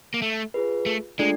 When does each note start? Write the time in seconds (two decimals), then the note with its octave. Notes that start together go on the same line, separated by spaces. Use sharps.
0.14 A#3
0.22 A3
0.54 F4 G#4 B4
0.86 A3
1.19 G#3 A3 D4 F4 A4 D5